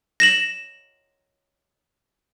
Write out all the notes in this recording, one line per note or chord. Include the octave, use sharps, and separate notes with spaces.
A#6 E7 F#7